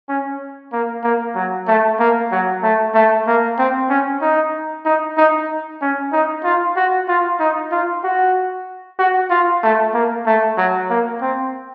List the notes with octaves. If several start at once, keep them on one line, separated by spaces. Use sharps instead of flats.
C#4
A#3
A#3
F#3
A3
A#3
F#3
A3
A3
A#3
C4
C#4
D#4
D#4
D#4
C#4
D#4
F4
F#4
F4
D#4
F4
F#4
F#4
F4
A3
A#3
A3
F#3
A#3
C4